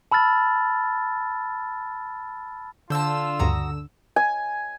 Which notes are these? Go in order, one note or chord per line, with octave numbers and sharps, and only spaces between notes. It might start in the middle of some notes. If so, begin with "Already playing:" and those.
A5 B5 E6 F6 A6
D3 F4 C5 A5 E6
D2 G2 C#3 F#4 A#5 D#6
G#5